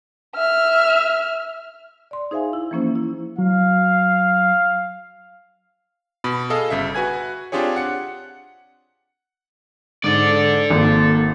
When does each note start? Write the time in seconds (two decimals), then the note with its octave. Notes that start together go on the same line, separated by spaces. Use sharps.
0.36 E5 F6
2.11 D5 C6
2.31 D#4 G#4 C5 E5 F5 G#5
2.53 E4
2.71 E3 F3 A#3 C#4 E4 C5
2.95 E4
3.38 F#3 F5
6.24 B2 B5
6.50 G#4 A4 D#5 F5
6.70 G1 C#3 E5
6.95 F#4 B4 G#5 G#6
7.52 C4 D4 F4 G4 G#4 C#5
7.76 F#5 C#7
10.04 G#2 D3 A4 D5
10.70 G#1 A#3